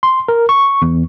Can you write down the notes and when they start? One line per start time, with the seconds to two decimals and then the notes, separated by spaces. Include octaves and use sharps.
0.03 C6
0.28 A#4
0.49 C#6
0.82 E2